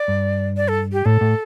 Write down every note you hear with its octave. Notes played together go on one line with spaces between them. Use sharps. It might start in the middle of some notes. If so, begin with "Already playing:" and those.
Already playing: D5
G2
D5
A4
G4
A2 A4
A2